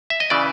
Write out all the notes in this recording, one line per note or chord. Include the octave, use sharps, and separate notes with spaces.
E5
D#5
C#3 E3 D5